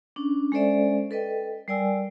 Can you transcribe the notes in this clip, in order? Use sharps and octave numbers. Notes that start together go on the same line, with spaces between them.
C#4 D4
G#3 C#4 A4 C5 D5 E5
A4 B4 D#5 G5
G3 A#4 D5 G5 G#5 E6